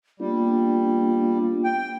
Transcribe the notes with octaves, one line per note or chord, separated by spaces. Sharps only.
G3 A#3 B3 D4 F4
G5